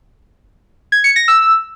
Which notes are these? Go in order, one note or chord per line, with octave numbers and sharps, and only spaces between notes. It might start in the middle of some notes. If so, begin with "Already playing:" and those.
G#6
C#7
A#6
E6